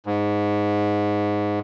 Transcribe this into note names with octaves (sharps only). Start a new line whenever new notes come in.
G#2